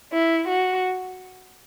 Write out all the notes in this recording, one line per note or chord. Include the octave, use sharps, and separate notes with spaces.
E4
F#4